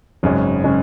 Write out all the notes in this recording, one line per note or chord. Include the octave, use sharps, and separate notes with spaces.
G#1 F#2 C#3 G#3 C#4
C#3 G#3 C#4